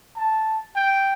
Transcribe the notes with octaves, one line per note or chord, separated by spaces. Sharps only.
A5
G5